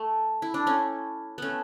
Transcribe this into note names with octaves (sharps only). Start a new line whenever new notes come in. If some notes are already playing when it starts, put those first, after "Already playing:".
Already playing: A3
E4
D4
A3 C#4
A3 B3 C#4